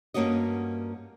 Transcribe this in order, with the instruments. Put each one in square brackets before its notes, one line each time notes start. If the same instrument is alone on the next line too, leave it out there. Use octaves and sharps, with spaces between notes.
[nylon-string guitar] G2 E3 A#3 C#4 F#4 D#5